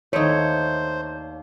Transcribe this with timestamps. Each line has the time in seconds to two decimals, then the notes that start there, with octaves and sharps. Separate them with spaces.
0.13 D#2 A3 D4 D#4 C5 C#5 C#7